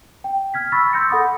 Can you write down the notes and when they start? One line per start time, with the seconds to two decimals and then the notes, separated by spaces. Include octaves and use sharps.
0.24 G5
0.54 F6 G#6 B6
0.72 B5 C#6 E6 A6 B6
0.93 C6 E6 G6 A6 A#6 C#7
1.10 A4 F#5 B5 D#6